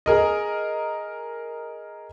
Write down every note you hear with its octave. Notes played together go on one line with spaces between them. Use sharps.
G#4 A#4 D#5